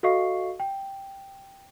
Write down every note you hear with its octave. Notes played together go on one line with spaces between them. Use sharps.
F#4 A4 D#5 F5 C#6 C7
G5